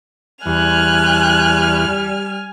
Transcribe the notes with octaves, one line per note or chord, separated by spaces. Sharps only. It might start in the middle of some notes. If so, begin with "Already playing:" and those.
E2 G3 G#5 F6 F#6